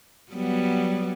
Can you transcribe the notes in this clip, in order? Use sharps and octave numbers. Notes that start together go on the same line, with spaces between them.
F#3 G3 B3